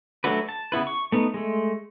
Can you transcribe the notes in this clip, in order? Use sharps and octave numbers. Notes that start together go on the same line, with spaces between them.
F#3 A3 D4 F#4 B4
A5
C#3 B3 E4 B4
C#6
A3 B3 D#4
G#3 A3